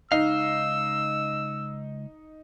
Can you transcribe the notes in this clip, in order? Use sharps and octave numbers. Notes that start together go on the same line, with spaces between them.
C#2 D#4 F5 E6